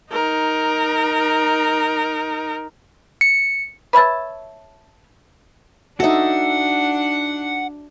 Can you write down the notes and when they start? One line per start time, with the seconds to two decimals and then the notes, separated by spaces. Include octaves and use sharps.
0.11 D#4 A#4
3.21 C#7
3.93 B4 C#5 E5 A5
6.00 D4 D#4 F#4 A4 E5 F#5